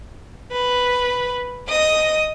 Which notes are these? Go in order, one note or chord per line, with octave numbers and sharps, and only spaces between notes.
B4
D#5 D#6